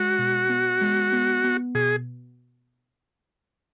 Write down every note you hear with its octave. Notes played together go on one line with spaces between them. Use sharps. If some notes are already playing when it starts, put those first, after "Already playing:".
Already playing: G#3 F#4
B2
B3
G#3
B3
B3
B2 G#4